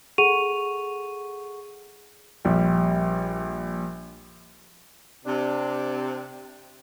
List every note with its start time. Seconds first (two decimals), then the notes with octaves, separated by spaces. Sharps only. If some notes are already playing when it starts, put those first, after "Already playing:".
0.18 G#4 A4 F#5 C#6 D#7 F7
2.45 A#1 G3
5.25 C3 D4